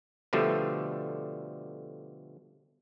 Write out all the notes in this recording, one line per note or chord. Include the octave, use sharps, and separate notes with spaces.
B2 D3 F3 G3 A3